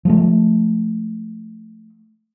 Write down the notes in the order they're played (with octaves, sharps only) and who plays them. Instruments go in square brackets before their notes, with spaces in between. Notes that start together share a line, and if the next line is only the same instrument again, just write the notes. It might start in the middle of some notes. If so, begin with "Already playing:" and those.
[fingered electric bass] F3 G#3 A3